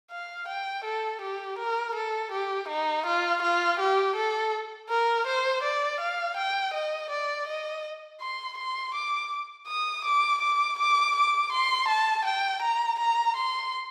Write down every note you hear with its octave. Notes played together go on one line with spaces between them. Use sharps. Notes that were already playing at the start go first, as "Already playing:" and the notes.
F5
G5
A4
G4
A#4
A4
G4
D#4
F4
F4
G4
A4
A#4
C5
D5
F5
G5
D#5
D5
D#5
C6
C6
D6
D#6
D6
D6
D6
D6
C6
A5
G5
A#5
A#5
C6